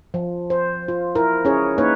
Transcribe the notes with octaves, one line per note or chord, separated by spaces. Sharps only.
F3
C5
F4
E4 A#4
C#4 E4 G#4 C#5
A#3 D#4 B4 C#5